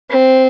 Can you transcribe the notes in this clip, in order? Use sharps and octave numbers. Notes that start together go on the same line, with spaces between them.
C4